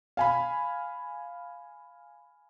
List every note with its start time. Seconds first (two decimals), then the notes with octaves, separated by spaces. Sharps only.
0.17 F5 G#5 B5